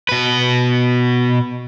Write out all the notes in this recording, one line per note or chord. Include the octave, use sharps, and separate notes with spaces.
B2 B4